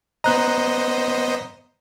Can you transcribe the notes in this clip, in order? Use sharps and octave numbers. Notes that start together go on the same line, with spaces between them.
B3 C5 D#5 A#5 F#6